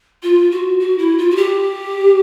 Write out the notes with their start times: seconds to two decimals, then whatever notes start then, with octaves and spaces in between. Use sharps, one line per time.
0.23 F4
0.51 F#4
0.80 F#4
0.98 E4
1.18 F4
1.31 F#4
1.36 G4